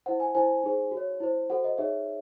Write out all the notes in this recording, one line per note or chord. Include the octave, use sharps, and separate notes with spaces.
E4 C5 F#5
G#5
E4 C5 G#5
D#4 G#4 C5
F#4
C#5
E4 C5
F#4 A4 C5 F#5
D#5
D#4 G#4 C#5 E5